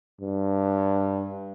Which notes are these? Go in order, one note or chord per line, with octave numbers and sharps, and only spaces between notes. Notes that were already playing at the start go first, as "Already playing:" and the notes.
G2